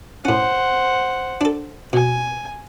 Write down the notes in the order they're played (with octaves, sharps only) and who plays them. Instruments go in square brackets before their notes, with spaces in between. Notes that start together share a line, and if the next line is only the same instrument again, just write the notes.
[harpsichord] A2 C#4 [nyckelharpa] C5 F#5
[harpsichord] D4 A4
[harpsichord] B2 [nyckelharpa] G#5